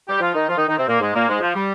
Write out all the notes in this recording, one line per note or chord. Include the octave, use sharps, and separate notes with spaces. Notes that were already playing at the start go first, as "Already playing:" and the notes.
G3 G4
F3 F4
D#3 D#4
F3 F4
D#3 D#4
D#3 D#4
C3 C4
A#2 A#3
G#2 G#3
A#2 A#3
G#2 G#3
F3
G3